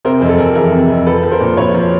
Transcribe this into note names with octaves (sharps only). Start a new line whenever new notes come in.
C3 A#4 C5
F2 G#4
A4
F2 G#4 A#4
E3 G#4 A#4
C3
F2
F3 A4 B4
F3
A#4 C5
A#2
A#2 B4 C#5
F3